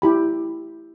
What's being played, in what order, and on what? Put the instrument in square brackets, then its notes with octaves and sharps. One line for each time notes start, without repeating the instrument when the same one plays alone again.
[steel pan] E4 G4 B5